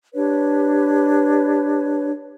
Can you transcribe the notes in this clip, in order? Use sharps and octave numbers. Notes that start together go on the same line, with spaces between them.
D4 G4 B4 C#5